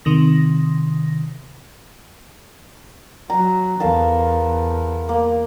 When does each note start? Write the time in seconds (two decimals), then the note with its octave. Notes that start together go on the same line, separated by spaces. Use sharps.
0.05 C3 D#3 A#6
3.30 F#3 A#5
3.80 E2 A4 A#4 F5
5.09 A#3